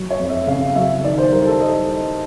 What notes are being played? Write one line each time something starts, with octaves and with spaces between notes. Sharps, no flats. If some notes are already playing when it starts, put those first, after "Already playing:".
Already playing: F#3
C#5
F2
E5
C#3 F5
F#3 E5
D#3 D5
C5
G3 A#4
A4
D#5